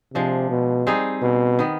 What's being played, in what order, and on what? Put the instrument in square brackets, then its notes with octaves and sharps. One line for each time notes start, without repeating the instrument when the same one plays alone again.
[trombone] C3 [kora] F3 G#3 D4
[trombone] B2
[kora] G3 C4 D#4 G#4
[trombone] B2
[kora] D#3 B3